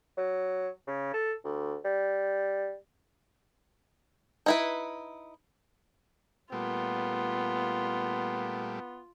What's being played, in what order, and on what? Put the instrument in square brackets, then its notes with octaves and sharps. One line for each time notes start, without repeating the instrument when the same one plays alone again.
[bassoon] F#3
C#3
A4
D2
G3
[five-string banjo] D#4 E4 B4
[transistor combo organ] A#2 G3 A3 [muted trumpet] B3 [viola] F4